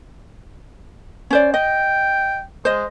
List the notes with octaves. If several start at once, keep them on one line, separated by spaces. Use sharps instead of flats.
C#4 C5 D5
D#5 G5
G#3 C5 D#5